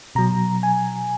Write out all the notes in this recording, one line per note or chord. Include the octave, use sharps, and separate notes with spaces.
B2 F#3 A#5
G#5